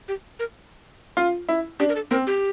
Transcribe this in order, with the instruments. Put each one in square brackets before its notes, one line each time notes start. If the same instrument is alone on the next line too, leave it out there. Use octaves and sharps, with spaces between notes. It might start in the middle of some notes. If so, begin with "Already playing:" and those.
[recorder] G4
A#4
[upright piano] F4
E4
[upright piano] D4 [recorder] G4
[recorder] A#4
A4
[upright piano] C4 [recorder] A#4
[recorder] G4